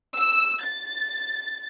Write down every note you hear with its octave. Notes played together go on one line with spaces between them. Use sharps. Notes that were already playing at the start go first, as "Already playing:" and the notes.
E6
A6